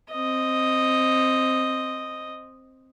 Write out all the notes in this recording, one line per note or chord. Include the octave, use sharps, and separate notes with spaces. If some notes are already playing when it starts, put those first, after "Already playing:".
C4 D#5